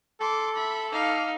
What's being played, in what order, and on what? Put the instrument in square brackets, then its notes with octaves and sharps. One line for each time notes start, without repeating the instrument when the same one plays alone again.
[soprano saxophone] A4 [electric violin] C6 D6
[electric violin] E5 B5
[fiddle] D#4 F5 [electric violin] D6 F6